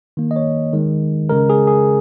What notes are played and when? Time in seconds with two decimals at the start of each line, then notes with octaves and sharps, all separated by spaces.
0.17 D#3 A#3
0.31 D#5
0.36 C#5
0.73 D#3 G#3
1.29 C#3 G#3 A#4
1.50 G#4
1.67 G#4